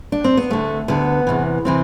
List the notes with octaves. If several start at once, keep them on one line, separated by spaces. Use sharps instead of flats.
D4
C4
B3
D2 D3 A3
D2 D3 B3
E2 C3 E3
C3 E3 C4